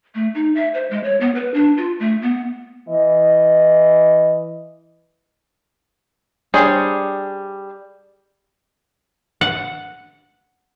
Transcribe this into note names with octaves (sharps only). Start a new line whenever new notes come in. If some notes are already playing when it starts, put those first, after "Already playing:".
A3
D#4
E5
C5
G#3
C#5
B3
B4
D4
F4
A3
B3
E3 D#5
G3 D4 G#4 C5 C#5
F#5